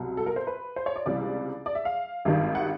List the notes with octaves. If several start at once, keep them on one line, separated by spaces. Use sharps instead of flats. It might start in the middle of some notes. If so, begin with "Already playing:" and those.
Already playing: C2 B2 F#3
A4
A#4
C5
B4
C5
C#5
D5
C#2 C3 E3 G3 D5
D5
E5
F5
G#1 G2 D#3 G3
F#5